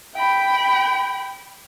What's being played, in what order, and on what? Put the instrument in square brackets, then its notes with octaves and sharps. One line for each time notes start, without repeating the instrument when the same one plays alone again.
[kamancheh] G5 B5